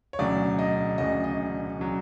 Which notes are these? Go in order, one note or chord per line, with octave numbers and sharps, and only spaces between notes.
C#5
E1 D2 C#3 F#3 D5
D#5
E1 D2 C#3 F#3 D#5
D#5
C#3 F#3